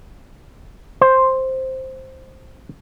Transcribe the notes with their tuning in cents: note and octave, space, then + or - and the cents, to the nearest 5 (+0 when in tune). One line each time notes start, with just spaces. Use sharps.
C5 +5